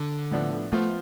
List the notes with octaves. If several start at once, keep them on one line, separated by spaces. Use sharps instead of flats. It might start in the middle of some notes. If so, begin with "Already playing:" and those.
Already playing: D3
A2 F3 B3 D4 A4
F3 A3 B3 F4 C5